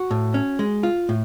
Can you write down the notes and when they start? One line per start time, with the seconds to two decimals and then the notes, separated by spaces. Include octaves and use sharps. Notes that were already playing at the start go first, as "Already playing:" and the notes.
Already playing: F#4
0.11 A2
0.34 C#4
0.59 G#3
0.83 F4
1.09 A2